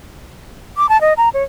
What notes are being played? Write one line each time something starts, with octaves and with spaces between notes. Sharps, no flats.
D6
A5
D#5
A#5
C#5